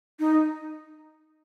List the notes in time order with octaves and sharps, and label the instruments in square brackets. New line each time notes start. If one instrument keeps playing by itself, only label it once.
[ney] D#4